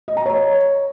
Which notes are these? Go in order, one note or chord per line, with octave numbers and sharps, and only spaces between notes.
D#5
A#5
C#5